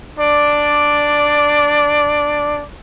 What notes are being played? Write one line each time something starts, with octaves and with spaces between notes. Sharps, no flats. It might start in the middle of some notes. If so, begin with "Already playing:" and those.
D4 D5